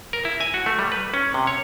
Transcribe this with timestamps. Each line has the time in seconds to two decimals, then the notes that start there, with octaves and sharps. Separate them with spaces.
0.13 A#4
0.25 E4
0.41 G#5
0.54 F#4
0.66 A3
0.79 G3
0.92 B4
1.14 C#4
1.34 C3
1.47 C#5